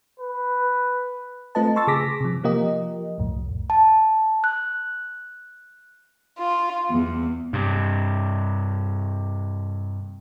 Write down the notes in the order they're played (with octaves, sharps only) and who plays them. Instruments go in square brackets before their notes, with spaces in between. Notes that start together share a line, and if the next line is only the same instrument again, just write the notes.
[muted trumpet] B4
[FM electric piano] A3 C4 F4 B4 D#5 A5
A5 C6 C#6 E6 A6
C#3 G#4 D6 A#6 B6
C3 F3
F3 A#3 F4 G4 A#4 D#5
C2 F2 A2
[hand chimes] A5
F#6
[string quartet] F4
E2
[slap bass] G2 C3